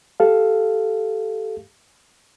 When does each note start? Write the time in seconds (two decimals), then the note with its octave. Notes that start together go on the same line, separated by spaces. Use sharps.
0.20 G4 A4 F5